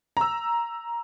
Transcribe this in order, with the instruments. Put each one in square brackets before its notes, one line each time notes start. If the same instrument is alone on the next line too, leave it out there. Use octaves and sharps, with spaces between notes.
[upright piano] A#5 E6